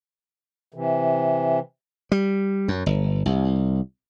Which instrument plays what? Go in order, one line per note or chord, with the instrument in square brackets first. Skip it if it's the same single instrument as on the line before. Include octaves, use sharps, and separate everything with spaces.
[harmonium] C3 E3
[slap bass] G3
F#2
G1
C2